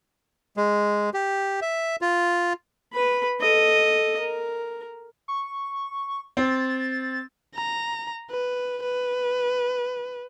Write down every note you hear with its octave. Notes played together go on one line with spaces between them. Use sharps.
G#3
G4
E5
F4
B4 B5
A4 D#5
A#4
C#6
C4 A6
A#5
B4
B4